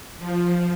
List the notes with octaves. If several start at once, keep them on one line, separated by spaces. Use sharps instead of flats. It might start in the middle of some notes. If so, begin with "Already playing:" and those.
F3